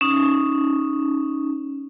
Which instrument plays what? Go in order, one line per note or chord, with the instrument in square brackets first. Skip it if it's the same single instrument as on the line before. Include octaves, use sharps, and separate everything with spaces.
[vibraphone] C#4 D#4